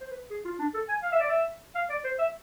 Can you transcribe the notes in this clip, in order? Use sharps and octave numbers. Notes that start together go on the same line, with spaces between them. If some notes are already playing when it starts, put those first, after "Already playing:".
C5
B4
G#4
F4
D4
A4
G#5
F5
E5
D5
E5
F5
D5
C5
E5